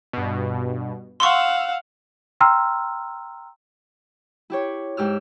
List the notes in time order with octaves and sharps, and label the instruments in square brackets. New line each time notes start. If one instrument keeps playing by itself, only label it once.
[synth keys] G2 B2
[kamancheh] F5 F#5 [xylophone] C6 C#6 [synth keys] E6
[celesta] G5 A#5 C6 E6 F6
[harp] E4 G4 C#5
G#2 G4 E6 F6